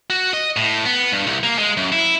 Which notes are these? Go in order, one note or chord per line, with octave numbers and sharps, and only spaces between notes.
F#4
D#5
A2
B3
G2
C2
A#3
G#3
F#2
E4